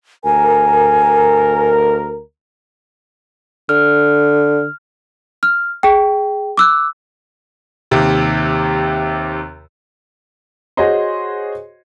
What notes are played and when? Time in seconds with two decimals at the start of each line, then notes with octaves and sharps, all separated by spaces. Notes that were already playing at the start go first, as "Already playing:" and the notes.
0.25 D2 A#4 G#5
3.69 D3 F6
5.43 F6
5.83 G#4 G5
6.57 D6 E6 F#6
7.91 D#2 C3
10.77 F#4 G#4 C5 C#5 D#5 C6